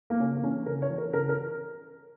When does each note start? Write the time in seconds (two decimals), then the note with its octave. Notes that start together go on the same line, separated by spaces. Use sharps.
0.10 A#3
0.20 C#3 C#4
0.36 A#3
0.43 E3 C#4
0.66 C#3 A#4
0.82 C#5
0.90 E3
0.98 A#4
1.13 C#3 A#4
1.29 A#4